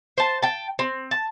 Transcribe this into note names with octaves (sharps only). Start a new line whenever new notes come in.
C5 A5
G5 A5
C4
A5